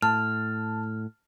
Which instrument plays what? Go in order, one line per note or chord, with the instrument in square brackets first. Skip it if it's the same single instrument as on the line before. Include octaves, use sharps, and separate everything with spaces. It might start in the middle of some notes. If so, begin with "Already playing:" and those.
[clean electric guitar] A2 [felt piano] A5 [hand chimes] F6